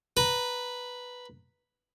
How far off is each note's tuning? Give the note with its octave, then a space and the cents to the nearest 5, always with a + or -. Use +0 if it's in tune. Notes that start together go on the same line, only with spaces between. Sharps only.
B4 +0 A#5 +0